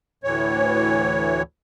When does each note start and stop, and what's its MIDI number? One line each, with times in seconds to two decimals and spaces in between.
0.24 1.42 38
0.24 1.42 45
0.24 1.42 52
0.24 1.42 73